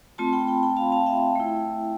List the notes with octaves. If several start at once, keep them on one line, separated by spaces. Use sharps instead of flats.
A3 C4 F4 A5 C6
G5 B5
G5 B5
G5 B5
F5 A5
F5 A5
E5 G5
A3 E4